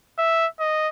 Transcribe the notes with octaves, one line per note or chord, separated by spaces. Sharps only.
E5
D#5